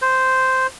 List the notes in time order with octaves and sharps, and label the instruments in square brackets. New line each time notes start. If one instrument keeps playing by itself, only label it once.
[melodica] C5